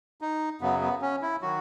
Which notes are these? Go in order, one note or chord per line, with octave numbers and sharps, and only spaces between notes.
D#4
F#2 C#3 F#3 B3
B3
C#4
E4
D#3 F#3 F#4